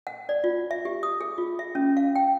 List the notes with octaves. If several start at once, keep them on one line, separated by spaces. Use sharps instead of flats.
F#5
D5
F4
E5
G4
D#6
G#4
F4
E5
C#4
F5
G5